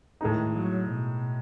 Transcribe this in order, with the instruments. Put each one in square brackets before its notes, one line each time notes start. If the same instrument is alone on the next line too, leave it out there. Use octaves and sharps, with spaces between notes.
[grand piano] A2 G#3 D#4 [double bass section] D#3
[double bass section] F#3
B2